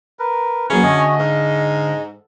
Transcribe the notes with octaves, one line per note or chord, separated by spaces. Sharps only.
A#4 B4
E3 F#3 A#3 C#4 G#4 B4 F5 A#5
D3 A3 F#4 G#4 D#5
G#2 F5